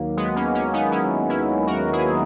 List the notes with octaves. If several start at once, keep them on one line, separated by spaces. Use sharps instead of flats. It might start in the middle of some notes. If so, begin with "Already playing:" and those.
Already playing: D#2 D#3 F#3 A#3
G#3 B3
A#3 C#4
A#3 C#4
B3 D#4
C#4 E4
C#4 E4
F#4 A#4
E4 G#4